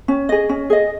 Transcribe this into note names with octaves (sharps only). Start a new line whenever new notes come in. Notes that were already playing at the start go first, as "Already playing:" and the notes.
C#4
G#4 D#5
C#4
G#4 D#5